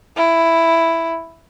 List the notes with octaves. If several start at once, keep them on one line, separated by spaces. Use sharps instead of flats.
E4